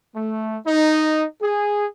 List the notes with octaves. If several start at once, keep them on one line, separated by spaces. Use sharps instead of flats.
A3
D#4
G#4